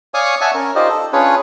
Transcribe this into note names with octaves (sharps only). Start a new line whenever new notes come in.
C#5 D5 F5 G#5 C#6 D#6
C#5 E5 F#5 G#5 A5 C#6
C#4 A#4
D#4 F4 G4 C5 D5 D#5
A4
C#4 D4 F4 G#4 B4 C#5